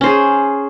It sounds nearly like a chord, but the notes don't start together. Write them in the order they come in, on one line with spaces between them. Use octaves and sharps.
C#4 C5 G#4